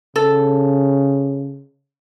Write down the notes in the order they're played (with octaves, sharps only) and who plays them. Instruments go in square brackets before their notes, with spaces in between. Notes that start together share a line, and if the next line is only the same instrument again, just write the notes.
[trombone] C#3 [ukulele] A4